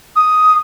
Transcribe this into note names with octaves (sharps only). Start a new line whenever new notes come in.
D#6